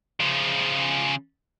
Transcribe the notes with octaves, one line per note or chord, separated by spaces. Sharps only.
C#3 F3